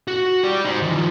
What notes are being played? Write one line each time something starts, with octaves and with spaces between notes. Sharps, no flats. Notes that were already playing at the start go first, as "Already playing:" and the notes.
F#4
G4 D5
D#4 C5
D#3 F3